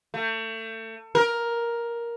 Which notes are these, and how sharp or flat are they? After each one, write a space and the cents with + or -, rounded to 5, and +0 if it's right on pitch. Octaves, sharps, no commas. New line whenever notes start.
A3 +30
A#4 +10